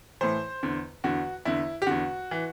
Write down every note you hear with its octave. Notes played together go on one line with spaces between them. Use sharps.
A2 E3 C5
E2 D3
E2 D3 F#4
E2 D3 E4
G4
E2 D3 F#4
E3